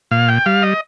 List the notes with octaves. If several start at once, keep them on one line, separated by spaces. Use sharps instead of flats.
A#2 F5
G5
G3 F5
D#5